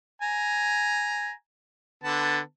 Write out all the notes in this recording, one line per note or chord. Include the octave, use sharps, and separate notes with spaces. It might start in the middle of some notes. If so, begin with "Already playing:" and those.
G#5 A#5
D3 B3 A5